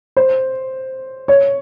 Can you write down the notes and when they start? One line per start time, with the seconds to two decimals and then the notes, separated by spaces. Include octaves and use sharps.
0.17 C5
1.28 C#5